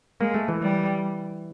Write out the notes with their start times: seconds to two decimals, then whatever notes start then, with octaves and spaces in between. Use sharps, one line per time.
0.21 G#3 A#3
0.34 A3
0.48 E3
0.62 G3